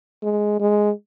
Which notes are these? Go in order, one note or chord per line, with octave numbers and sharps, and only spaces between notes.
G#3
G#3